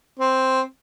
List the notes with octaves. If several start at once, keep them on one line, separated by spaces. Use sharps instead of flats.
C4